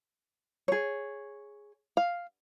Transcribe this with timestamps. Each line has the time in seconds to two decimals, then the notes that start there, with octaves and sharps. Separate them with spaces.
0.68 G#4 C#5
1.97 F5